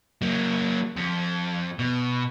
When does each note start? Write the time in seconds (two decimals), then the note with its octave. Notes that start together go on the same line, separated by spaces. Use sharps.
0.22 F#3 A#3
0.97 F2
1.79 B2